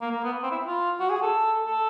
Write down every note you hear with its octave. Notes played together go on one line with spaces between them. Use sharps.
A#3
A#3
B3
C4
E4
F4
F#4
G#4
A4
A4